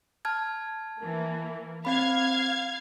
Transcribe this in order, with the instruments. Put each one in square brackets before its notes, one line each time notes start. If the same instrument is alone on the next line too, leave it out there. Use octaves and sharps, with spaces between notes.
[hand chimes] A5 F6 G#6
[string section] E3 A#3
[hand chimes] C4 B5 [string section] F5 G#6